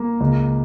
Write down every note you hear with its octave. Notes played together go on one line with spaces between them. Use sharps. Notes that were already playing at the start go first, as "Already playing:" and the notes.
Already playing: A#3 A#4
C#2